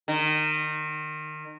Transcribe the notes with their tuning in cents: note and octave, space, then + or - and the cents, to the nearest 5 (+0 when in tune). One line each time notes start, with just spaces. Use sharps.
D#3 -25